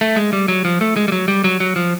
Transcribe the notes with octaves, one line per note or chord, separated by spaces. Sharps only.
A3
G#3
G3
F#3
F3
A3
G#3
G3
F#3
G3
F#3
F#3
F3